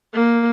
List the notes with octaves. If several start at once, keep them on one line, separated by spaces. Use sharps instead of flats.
A#3